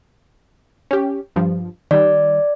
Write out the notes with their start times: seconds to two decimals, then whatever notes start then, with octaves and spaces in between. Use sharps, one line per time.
0.91 C#4 G4
1.36 G2 F3
1.91 D#3 G3 D5